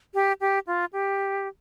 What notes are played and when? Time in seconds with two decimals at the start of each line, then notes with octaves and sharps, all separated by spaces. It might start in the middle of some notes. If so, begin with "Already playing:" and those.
0.14 G4
0.41 G4
0.67 F4
0.93 G4